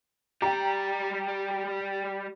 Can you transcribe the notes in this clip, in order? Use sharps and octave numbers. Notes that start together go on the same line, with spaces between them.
G3 G4 G5 A#5